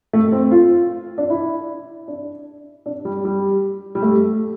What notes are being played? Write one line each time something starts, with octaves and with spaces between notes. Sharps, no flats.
A3
C4
F4
D4
E4
D4
D4
G3
G3
G3
A3